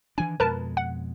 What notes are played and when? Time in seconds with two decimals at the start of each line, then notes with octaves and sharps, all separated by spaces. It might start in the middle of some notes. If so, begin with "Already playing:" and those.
0.18 D#3 E3 D4 G#5
0.40 F2 B2 G#3 A#4 B4 A5
0.77 F#5